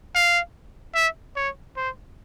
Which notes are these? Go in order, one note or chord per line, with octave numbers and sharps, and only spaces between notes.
F5
E5
C#5
C5